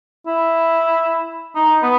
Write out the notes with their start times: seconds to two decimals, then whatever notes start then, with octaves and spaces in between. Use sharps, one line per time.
0.27 E4
1.55 D#4
1.82 B3